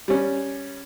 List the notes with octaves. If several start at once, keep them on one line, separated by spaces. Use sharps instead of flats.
G3 C#4